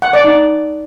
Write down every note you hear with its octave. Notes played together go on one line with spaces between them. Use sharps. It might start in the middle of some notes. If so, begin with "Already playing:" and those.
F#5
D5
D#4